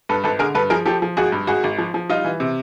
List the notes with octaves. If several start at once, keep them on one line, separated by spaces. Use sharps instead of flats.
G2 A4 B4
G#1 A4 B4
D3 G#4 A#4
G2 A4 B4
F3 G#4 A#4
F3 G4 A4
F3
G#1 F#4 G#4
G2
G#1 F#4 G#4
G#1
F3
F3
G3 D#4 F4
E3
C3